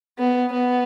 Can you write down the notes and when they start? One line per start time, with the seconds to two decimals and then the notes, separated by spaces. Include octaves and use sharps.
0.18 B3
0.52 B3